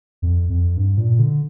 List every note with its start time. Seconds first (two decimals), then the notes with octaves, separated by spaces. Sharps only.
0.22 F2
0.50 F2
0.77 G2
0.98 A#2
1.19 D3